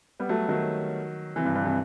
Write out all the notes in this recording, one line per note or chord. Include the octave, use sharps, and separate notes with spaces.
G3 B3
F#3 A3
D#3 F#3
C3 E3
G2
G2
C3 E3